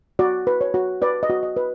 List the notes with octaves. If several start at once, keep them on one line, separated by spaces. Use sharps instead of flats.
F#4 D5
B4
C#5
F#4
B4 D5
D#5
F#4
D#5
B4